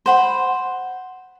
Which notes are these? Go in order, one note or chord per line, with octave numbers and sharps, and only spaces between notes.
C5 F#5 B5